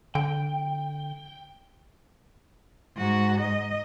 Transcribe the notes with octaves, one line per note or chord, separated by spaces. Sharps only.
D3 G5
G#2 F#4
D#5